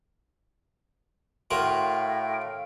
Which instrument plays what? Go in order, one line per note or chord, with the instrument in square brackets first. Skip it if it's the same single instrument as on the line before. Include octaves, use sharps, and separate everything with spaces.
[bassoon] A2 [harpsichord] F4 F#4 A#4 [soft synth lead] F5 [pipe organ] G5